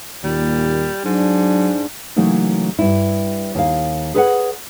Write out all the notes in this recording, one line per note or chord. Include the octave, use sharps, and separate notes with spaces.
D#2 A#2 G3
G#2 F#3 D4
C#3 E3 F#3 A3 A#3 D#4
G2 E4
D#2 A#4 F5
G#4 A4 B4 C#5 E5 F#5